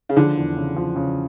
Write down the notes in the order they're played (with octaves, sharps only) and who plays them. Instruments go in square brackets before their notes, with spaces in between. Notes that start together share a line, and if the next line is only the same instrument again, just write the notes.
[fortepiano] C#3
[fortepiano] D3 [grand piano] F3
[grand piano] E2
C#3
F3
C#3